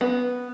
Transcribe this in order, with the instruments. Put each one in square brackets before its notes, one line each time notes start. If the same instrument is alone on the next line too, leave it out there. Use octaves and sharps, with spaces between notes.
[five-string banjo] B3